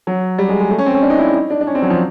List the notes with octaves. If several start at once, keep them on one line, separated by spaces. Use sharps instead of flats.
F#3
G3
G#3
G#3
A3
C#4
C4
C#4
D4
D#4
E4
D#4
D4
D4
C#4
C4
F#3
F3